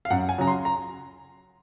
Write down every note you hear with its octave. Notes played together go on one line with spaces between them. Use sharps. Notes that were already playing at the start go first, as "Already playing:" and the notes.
F5
F#2 F#5
G#5
C#3 F#3 A#5
C6
A#5